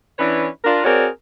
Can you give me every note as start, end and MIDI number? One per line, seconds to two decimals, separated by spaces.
0.18 0.46 52
0.18 0.46 61
0.18 0.46 62
0.18 0.46 64
0.18 0.46 71
0.18 0.46 73
0.64 0.84 62
0.64 0.84 65
0.64 0.84 70
0.84 1.06 60
0.84 1.06 66
0.84 1.06 68
0.84 1.06 70
0.84 1.06 73
0.84 1.06 74